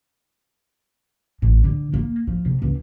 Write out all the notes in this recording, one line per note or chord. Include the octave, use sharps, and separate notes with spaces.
A1
D3
A#3
F3
C3
C#2